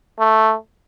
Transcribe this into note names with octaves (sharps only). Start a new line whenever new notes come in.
A3